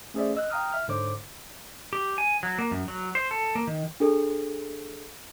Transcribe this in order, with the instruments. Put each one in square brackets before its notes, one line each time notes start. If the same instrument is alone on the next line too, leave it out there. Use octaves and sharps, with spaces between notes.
[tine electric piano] A3 C#4 G#4 C5 D5 E5
D#5 E6 F#6
F5 G5 A#5 D#6 F6
E5 F6
G#2 D3 C5 C#5 D6
[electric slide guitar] G4
G#5
F#3
A#3
F#2
F#3
C5
A4
A#3
D#3
[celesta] D4 G#4 A4